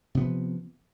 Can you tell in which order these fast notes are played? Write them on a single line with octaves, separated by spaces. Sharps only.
C3 B3 F3